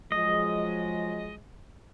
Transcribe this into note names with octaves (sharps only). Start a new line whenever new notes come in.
F3 F#3 G#3 D#5